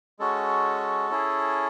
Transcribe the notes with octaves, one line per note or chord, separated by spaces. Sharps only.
G#3 C#4 F#4 A4
C#4 E4 G#4